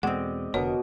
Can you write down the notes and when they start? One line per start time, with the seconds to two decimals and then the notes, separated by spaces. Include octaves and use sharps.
0.03 E2 B2 G#3 C4 D5 D#5 F#5
0.54 F1 B2 D3 A#4 C#5